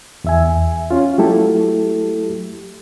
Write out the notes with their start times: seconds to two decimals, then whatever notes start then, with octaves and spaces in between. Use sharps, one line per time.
0.24 E2 E5 G#5
0.91 C#4 F4
1.18 F#3 A3 E4 G4 A4